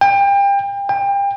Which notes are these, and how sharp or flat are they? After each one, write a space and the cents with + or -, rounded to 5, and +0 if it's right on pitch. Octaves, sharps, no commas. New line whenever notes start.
G5 +30
G5 +30